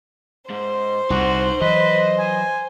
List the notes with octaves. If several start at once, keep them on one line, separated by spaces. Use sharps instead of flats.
G#2 C5
C2 D#4 F#4 F#5
E3 F#3 B4 D#5
G#5